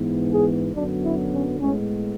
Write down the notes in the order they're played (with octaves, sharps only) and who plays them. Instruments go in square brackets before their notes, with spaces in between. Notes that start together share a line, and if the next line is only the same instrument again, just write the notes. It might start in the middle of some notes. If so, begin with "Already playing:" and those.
Already playing: [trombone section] G#2 E3 B3
G#4
F#2 D3 F#3 B3 D4
E4
C#4
A2 G#3 B3 C#4